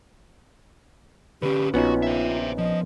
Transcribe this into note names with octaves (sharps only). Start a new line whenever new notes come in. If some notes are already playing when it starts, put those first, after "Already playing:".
D3 C#4 G4 B4
A#1 B3 C#4 D#4 F4 F#4
C5 E5
F3 D#5